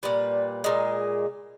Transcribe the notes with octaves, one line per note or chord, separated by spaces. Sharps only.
A#2 G3 B4
A#2 G#3